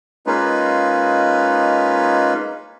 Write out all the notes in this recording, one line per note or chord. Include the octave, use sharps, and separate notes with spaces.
G#3 A#3 C#4 D#4 F4 B4